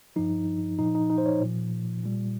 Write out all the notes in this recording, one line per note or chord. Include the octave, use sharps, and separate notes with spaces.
G2 F3 D#4
A#2 F3 D#4
D#4
D#4
C5
C#5
A#2 F3
A#2 G3